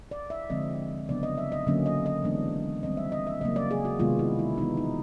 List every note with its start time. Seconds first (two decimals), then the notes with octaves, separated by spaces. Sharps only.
0.11 D5
0.30 E5
0.50 D3 F3 G#3 C4 D#5
1.09 C#3 F#3 B3 D4 D5
1.23 D#5
1.38 E5
1.52 D#5
1.67 D3 F#3 A#3 C#4
1.86 D#5
2.06 D#5
2.24 E3 G#3 B3 D4
2.83 D#3 G3 C4 D#5
2.97 E5
3.12 D#5
3.27 E5
3.41 C#3 F#3 A#3 D#5
3.56 D5
3.71 G#4
3.85 F#4
3.99 C3 D#3 G#3 B3 F4
4.19 E4
4.39 E4
4.58 E3 G#3 B3 D#4
4.77 D#4